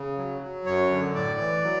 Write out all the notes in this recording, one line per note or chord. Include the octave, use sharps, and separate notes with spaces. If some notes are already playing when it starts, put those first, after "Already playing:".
Already playing: C#3
F#3
F#3
F#2 C#5
D3
A2 D5
E3
F#3